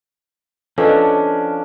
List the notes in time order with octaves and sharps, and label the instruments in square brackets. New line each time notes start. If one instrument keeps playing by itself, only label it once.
[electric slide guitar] F3 C#4 D4 [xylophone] A4 B4 D#5